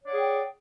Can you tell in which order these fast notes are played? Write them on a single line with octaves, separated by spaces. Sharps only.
C#5 D5 F#5 G#4 G5